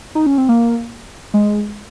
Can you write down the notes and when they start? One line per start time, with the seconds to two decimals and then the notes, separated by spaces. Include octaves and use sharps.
0.15 D#4
0.26 C#4
0.38 C4
0.49 A#3
1.34 G#3